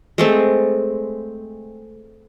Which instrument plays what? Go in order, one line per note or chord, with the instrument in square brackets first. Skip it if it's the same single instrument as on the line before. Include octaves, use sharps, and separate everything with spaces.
[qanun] G#3 A3 C4